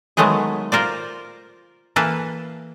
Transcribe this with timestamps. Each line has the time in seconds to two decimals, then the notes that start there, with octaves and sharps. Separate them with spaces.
0.17 D#3 F#3 G#3 A3 B3 G#4
0.72 F4 A#4 C5 D5
1.96 E3 A#3 A4 B4 F5